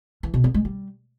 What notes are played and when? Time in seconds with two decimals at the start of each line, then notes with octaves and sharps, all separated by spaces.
0.23 E3
0.34 B2
0.44 B3
0.54 G#3
0.65 G3